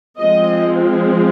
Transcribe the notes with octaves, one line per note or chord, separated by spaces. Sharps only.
F3 G#3 C4 D#5